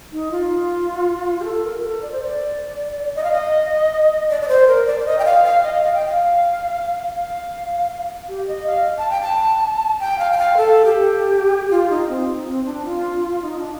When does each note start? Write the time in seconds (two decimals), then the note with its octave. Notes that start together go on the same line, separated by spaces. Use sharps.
0.12 D#4
0.31 F4
1.40 G4
1.45 A4
1.64 A#4
1.83 A4
2.02 D5
2.12 C5
2.22 D5
3.16 D#5
3.23 F5
3.31 D#5
4.30 D5
4.41 D5
4.48 C5
4.68 A#4
4.86 D5
5.00 D5
5.06 D#5
5.19 G5
5.25 F5
5.44 F5
5.63 D#5
5.82 F5
5.94 G5
6.06 F5
7.15 F5
8.29 G4
8.47 D#5
8.67 F5
8.98 A5
9.10 G5
9.22 A5
10.00 G5
10.19 F5
10.31 G5
10.38 F5
10.57 A4
10.85 G4
11.71 F4
11.90 D#4
12.09 C4
12.47 C4
12.66 D4
12.85 F4
13.42 D#4
13.59 D4